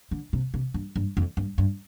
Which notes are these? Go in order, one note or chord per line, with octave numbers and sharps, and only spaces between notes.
D3
C3
C3
G2
G2
F2
G2
G2